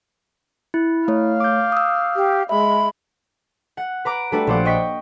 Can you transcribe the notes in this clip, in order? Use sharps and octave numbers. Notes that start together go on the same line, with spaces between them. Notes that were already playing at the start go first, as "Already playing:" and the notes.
E4
A3 C#5 F5
D6 G6
D#6 E6
G4
G#3 E5 B5
F#5
B4 A#5 D6
G3 A3 D4 F#4 B4
A#1 C5 F#5 D6
D#5 G5 C#6 B6